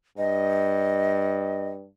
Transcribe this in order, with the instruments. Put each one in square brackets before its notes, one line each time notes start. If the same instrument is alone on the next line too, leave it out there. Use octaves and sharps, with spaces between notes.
[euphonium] G2 [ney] D#5